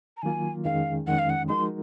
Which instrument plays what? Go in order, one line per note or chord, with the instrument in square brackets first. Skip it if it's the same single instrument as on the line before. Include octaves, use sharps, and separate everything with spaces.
[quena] A#5
[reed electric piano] D#3 F#3 A#3 F4 [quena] G#5
[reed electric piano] F2 D#3 G#3 C#4 G#4 [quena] F5
[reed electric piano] F2 D#3 G#3 C#4 [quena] F#5
[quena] F5
F#5
[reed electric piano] F3 G#3 D#4 F#4 A#4 [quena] C6